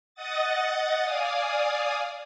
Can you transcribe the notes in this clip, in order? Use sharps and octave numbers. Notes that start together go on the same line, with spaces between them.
D#5 F#5 D#6 A6
D5 F5 G#5 D#6